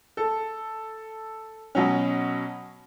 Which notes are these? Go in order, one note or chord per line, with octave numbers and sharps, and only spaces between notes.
A4
B2 F#3 C#4